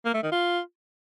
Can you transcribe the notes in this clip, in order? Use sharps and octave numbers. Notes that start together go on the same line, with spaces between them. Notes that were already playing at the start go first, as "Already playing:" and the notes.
A#3
A3
D#3
F4